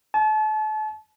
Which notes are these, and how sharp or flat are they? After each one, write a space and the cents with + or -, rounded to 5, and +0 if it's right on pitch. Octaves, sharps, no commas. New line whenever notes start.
A5 -35